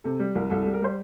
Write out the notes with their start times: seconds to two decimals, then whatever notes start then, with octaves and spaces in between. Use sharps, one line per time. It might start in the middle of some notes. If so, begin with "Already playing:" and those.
0.04 C3 A4
0.19 G3
0.35 C2 A#4
0.50 C2 A4
0.62 A4
0.66 G3
0.73 A#4
0.82 G3 C5